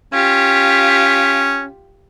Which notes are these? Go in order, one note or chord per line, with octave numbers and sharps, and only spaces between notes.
C#4 F4 G4